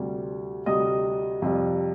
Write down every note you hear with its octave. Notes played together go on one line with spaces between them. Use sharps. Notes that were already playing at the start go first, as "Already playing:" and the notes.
Already playing: D2 C3 G3
D2 C3 G3 D#5 D#6
F2 C3 G3